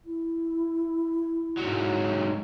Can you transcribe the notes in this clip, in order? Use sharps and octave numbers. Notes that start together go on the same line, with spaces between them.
E4
G#2 F#3